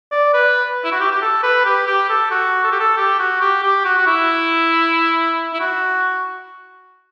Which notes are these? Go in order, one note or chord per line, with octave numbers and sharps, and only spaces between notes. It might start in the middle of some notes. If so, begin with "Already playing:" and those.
D5
B4
E4
F#4
G4
G4
A4
B4
G4
G4
A4
F#4
A4
G4
A4
G4
F#4
G4
G4
F#4
F#4
E4
E4
F#4